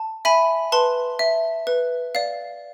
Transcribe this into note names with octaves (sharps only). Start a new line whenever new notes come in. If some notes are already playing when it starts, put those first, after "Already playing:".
Already playing: A5
E5 G#5 B5
B4 A5 C6
E5
B4
D5 F5